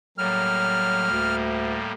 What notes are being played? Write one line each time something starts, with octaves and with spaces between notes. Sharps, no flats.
A2 F#3 G3 A#3 F6
D2